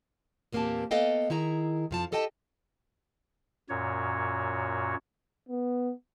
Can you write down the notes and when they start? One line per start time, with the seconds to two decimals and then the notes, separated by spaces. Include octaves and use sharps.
0.52 E2 A#2 A#3 C4 G4 A5
0.91 A#3 B3 A4 D#5 F5 G5
1.30 D#3 E4 G#4 A#5
1.91 F2 F3 A5
2.12 G4 A4 D#5 G5 A5
3.69 F#2 A#2 F#4 C#5
5.49 B3